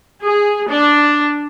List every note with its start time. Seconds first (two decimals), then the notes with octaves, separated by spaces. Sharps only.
0.21 G#4
0.68 D4